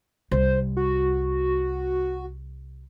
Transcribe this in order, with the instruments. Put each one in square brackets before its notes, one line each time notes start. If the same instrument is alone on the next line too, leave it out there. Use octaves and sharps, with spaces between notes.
[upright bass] C2 [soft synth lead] C5
[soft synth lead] F#4